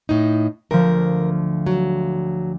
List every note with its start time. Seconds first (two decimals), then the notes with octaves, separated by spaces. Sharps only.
0.09 A2 D#4
0.71 D2 F3 A#4
1.66 F#3